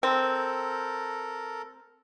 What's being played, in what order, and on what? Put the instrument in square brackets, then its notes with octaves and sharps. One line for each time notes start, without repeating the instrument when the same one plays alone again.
[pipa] C4 [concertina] A4 A#4